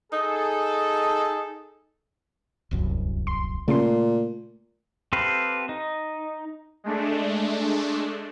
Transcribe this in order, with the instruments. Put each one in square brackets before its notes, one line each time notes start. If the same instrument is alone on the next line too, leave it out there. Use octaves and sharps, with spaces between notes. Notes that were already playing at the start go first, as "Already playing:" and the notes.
[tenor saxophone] D#4 [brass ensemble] G#4 A4
[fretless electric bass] D1 C2 F#2
[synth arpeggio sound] C6
[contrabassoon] A#2 [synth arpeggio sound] C#3 C6 [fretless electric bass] A3
[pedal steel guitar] C4 G4 A4 B4 F5
D#4
[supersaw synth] G#3 A3 D4